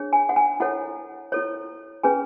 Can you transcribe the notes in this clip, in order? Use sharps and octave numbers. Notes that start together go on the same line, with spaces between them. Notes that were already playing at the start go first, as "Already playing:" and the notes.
Already playing: D4 G#4 C#5
G#5
F#5
G#5
E4 A4 C#5 F#5
E4 A4 C#5
C#4 G#4 B4 G#5